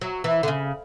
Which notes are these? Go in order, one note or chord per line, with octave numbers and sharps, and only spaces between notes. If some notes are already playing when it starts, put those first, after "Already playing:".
F#3
E3
D3
C#3